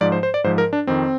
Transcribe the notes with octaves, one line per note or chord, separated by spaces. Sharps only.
G#2 F3 D5
C5
C5
D5
G#2 F3 C5
A#4
D4
F2 D#3 C4